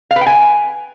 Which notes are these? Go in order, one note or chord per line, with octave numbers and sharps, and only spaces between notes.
F5
B4
G5
G#5